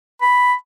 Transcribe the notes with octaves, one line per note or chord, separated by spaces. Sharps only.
B5